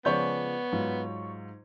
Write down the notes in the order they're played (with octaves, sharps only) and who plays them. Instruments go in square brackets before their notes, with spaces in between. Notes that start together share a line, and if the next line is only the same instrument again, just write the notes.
[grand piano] C#3 F3 G#3 [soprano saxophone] B3 [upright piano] C#5 D5 G6
[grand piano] G#2 F#3 F4